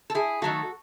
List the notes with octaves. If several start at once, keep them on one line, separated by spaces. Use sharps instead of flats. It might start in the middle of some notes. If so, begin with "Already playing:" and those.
A4
E4 G#4
D#3 F#3 A3 F#4 A4